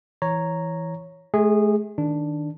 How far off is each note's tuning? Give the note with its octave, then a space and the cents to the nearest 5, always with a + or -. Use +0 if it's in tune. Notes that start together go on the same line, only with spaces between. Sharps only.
E3 +0 C#5 +0 A#5 -5
A3 -45 G#4 -20
D#3 +0 D4 +0